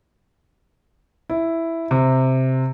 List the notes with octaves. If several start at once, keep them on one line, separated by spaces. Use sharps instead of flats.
E4
C3